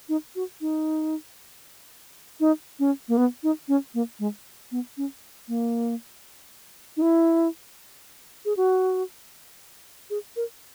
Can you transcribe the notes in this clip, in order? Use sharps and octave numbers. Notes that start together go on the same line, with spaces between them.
D#4
F#4
D#4
D#4
C#4
A#3
B3
D#4
C#4
A#3
G#3
B3
C#4
A#3
D#4
E4
G#4
F#4
G#4
A#4